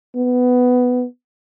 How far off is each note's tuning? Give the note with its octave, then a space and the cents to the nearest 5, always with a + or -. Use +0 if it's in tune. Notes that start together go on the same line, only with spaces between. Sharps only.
B3 +10